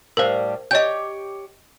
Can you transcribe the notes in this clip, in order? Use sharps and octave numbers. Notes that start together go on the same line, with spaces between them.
A2 G3 A#4 C5 F5
G4 C#5 D#5 G5 G6